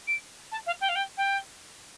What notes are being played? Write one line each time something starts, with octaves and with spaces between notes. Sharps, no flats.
D7
A5
F5
G5
F5
G5
G5